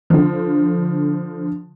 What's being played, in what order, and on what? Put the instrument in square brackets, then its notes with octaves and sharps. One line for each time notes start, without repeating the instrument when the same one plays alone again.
[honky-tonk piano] D3 F3